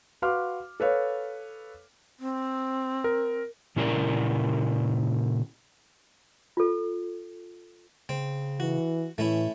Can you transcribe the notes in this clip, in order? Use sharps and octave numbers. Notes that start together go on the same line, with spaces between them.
F#4 B4 F5 C6 D6 F6
A4 B4 C#5 F5
C4
A#4
A#2 C#3 C#4 E4 A#4 D5
F4 A4
C#3 C4
E3 F#4
A2 E3 A3 C#4 E4